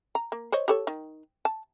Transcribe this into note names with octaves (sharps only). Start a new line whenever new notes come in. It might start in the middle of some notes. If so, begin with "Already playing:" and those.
A#5
A#3
C5 C#5 D#5
G4 A4 C#5
D#3
A5